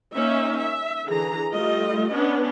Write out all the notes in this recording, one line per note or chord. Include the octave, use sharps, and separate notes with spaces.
A#3 C#4 D#4 E5
E5
D3 E3 G#4 A#5
G3 A3 F4 D#5
B3 C#4 D4